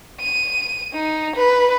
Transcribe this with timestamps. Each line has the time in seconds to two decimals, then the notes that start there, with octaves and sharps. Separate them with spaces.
0.20 D#7
0.94 D#4
1.36 B4